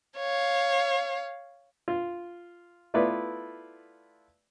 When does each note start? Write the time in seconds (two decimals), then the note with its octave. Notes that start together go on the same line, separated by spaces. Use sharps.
0.18 C#5 F5
1.88 F4
2.94 A3 B3 E4 F4 B4 D5